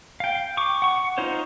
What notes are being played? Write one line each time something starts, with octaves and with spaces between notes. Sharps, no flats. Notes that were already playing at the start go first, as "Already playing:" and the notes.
F5 G5
C#6 D6
F#5 C#6
D#4 F4 C5 C#5